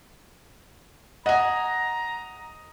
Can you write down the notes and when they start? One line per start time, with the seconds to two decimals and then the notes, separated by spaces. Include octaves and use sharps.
1.26 D#5 F#5 G#5 A#5